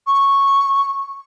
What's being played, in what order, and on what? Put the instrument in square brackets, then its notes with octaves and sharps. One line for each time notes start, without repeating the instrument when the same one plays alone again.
[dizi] C#6